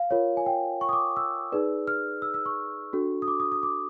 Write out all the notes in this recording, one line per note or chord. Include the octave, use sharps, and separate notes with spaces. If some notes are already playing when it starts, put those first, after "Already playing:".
Already playing: F5
F4 A#4 C#5
G#5
G5
C#6
D#6
D6
E6
D#4 G#4 B4 D5
F6
E6
E6
C#6
D4 F#4 A4
D#6
D6
D#6
D#6
D6